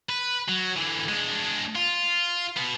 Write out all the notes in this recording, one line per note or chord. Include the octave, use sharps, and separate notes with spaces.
B4
F#3
D3 E3
G#3 D4
F4
B2 B3